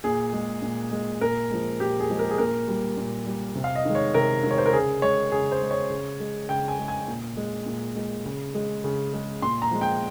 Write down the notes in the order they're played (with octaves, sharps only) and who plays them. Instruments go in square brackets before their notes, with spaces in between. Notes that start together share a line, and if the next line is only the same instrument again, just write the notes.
[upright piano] A#2 G#4
G#3
A#2
G#3
A#2 A#4
F3 G#3
A#2 G4
G#4
F3 G#3
A#4
G#4
A#2 A#4
G3
A#2
G3
C3
F5
D#5
D#3 G#3
C#5
C3 A#4
D#3 G#3
C#5
C5
A#4
C#3 G#4
G#3 C#5
C#3 G#4
C5
G#3
C#5
C#3
G#3
C#3 G5
G#5
G#3
G#5
A#2
G#3
A#2
G#3
C#3
G#3
C#3
G#3
A#2 C6
A#5
F3 G#3
G5